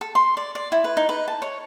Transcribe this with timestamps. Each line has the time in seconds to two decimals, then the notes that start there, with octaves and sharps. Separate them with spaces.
0.01 A4
0.15 C6
0.37 D5
0.55 D5
0.72 E4
0.84 B4
0.97 D#4
1.09 B4
1.28 A5
1.42 C#5